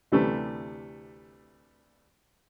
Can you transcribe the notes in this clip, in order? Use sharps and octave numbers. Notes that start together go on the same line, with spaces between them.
D2 C3 E3 G3 A3